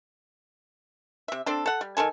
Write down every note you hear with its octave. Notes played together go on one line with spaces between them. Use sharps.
C3 E5
C4 D4 A4
A4 F#5
G3
D#3 F3 A4 G#5